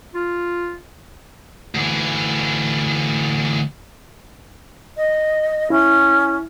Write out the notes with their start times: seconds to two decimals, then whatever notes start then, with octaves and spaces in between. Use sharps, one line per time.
0.15 F4
1.75 D2 E3
4.97 D#5
5.70 C#4 E4